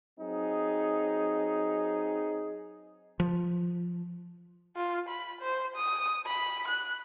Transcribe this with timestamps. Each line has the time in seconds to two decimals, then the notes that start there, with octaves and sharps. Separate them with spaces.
0.19 F#3 C4 D#4 G#4
3.20 F3
4.77 F4
5.09 B5
5.41 C5
5.76 D#6
6.26 B5
6.68 F#6